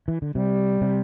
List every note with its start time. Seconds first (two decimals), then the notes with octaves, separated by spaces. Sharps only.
0.08 E3
0.22 D3
0.35 C3 G3
0.81 C3